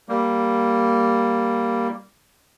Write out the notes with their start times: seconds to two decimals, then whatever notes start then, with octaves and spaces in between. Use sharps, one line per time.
0.09 G3 A#3